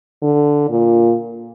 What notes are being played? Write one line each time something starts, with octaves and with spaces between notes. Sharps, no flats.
D3
A#2